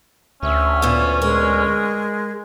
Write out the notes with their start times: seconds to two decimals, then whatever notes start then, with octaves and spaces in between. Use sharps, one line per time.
0.43 D2 C#4 E5
0.82 A#2 B3
1.22 G#3 A#4